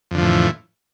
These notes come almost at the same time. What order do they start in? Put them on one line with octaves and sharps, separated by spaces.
F2 D3 F3 A2 E3